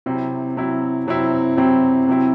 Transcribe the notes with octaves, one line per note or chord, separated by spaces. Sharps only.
C3 F#3 C4 E4
C3 F#3 C4 E4
C3 F#3 C4 E4
C3 F#3 C4 E4
C3 F#3 C4 E4